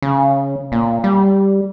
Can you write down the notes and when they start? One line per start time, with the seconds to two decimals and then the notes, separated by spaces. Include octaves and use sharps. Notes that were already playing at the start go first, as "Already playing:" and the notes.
0.02 C#3
0.72 A#2
1.04 G3